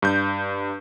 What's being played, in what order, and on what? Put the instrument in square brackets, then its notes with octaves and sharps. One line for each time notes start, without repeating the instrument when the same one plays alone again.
[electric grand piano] G2 G6